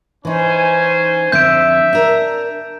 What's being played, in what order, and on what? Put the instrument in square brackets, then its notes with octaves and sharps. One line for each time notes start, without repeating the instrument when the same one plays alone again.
[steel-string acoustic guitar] E3 D#4 [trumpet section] C#4 C5 G#5
[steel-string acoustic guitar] F2 D3 C4 [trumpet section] E5 [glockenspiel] G6 D7
[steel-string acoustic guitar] D4 A#4